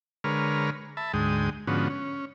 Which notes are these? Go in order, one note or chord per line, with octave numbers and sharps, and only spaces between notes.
D3 G#3 A#4 B4 C#5 F6
E5 A5 B5
D2 G#2 G#3 G5 D#6
G#2 D3 F3 B3 C#4 F#4
C#4